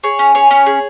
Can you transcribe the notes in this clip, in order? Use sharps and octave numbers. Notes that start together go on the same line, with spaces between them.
G#4 C#5
C#4
G#4 C#5
C#4
G#4